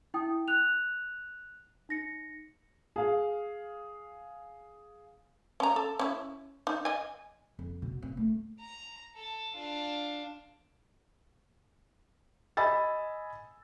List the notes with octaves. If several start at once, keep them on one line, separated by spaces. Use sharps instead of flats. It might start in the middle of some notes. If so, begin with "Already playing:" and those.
E4 G5 D#6
F#6 F7
D#4 A#6 C#7
G#4 F5
C#4 A#5
A4
C#4 E4
D#4
D#5 G#5
F2
B2
C4
A3
A#5
A4 A5
D4 F4
D#5 G#5 B5 E6 A6